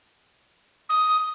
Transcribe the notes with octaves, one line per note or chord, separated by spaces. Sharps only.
D#6